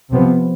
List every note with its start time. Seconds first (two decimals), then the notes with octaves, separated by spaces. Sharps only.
0.10 C3 F3 B3